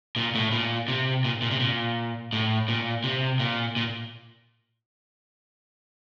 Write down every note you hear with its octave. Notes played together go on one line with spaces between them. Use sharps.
A#2
A2
A#2
C3
A#2
A#2
C3
A#2
A2
A#2
C3
A#2
A#2